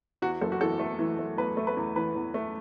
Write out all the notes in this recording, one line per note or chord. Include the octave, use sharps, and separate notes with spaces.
E2 F#4
F#1 A4
F#4
E3 A4
A3
E3
A3
E2 B4
A3
B4
E2
E3 B4
E2
A3